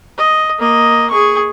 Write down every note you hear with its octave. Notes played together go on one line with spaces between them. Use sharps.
D#5
A#3 D#5
G#4 C#6